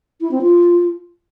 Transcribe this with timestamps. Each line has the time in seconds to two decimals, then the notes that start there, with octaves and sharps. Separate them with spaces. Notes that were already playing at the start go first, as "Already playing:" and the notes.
0.21 E4
0.31 C4
0.42 F4